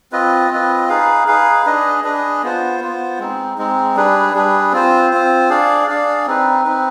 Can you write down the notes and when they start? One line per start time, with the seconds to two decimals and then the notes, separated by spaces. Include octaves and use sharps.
0.12 C4 F4 B4 D#5
0.51 C4 F4 B4 D#5
0.89 D#4 G#4 B4 F5
1.27 D#4 G#4 B4 F5
1.66 D4 G#4 B4 D#5
2.04 D4 G#4 B4 D#5
2.43 B3 F4 C5
2.80 B3 F4 C5
3.19 G#3 C4 D#4
3.58 G#3 C4 D#4
3.95 G3 D4 G#4 B4
4.34 G3 D4 G#4 B4
4.72 C4 F4 C5
5.11 C4 F4 C5
5.49 D4 G#4 D5 F5
5.88 D4 G#4 D5 F5
6.26 C4 D#4 B4
6.65 C4 D#4 B4